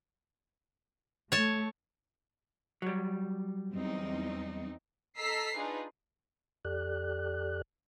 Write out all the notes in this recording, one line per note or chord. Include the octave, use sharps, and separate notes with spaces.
A3 C#5 A5
F#3 G3
E2 C4 D#4
A4 D#5 A#5 E6 B6 C7
D4 D#4 F4 G#4 B4
F2 G4 A4 D5 F#6